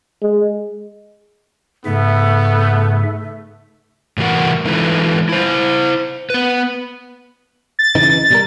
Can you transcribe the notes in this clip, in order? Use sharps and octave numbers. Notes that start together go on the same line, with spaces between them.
G#3
G#2 C#3 A3 B3 E5
A2 C3 E3 F#4 A#4 F#5
E3 G#3 D#4 F4 A4 B4
E4 C5
B3 B4
A6
C#3 E3 D#4
B2 G3 A#4